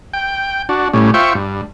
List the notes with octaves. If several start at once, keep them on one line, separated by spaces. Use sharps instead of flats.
G5
D4 F#4
A2 G3 C#4
F4 C5 E5 G5 C#6
G2